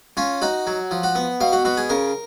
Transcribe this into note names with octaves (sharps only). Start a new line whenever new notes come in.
C#4 F4
D#4 F#4
F#3
F3
F#4
B3
B2 F5
F#4
B2 F#4
G#4
C#3 A#4